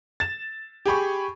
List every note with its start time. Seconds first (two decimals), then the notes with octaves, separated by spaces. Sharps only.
0.20 A6 E7
0.86 G4 G#4 B5 C#6